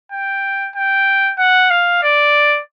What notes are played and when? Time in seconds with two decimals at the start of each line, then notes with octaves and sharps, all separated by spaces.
0.12 G5
0.76 G5
1.38 F#5
1.70 F5
2.03 D5